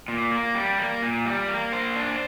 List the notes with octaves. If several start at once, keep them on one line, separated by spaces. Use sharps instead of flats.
A#2
A#3
G3
A#3
A#2
G3
A#3
C5
D4